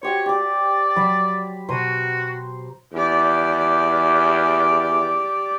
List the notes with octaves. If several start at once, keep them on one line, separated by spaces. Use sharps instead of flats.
F#4 G4 C5 C#5
G4 D5 D6
F#3 A5 B5
B2 F#4 C5 A#5 C#6 D#7
E2 G4 D5